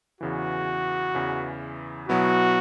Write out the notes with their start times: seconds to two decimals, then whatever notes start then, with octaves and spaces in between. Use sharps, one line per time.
0.21 E2 C#3 E3 F#4
1.15 E2 C#3 E3
2.09 B2 F#3 B3 E4 F#4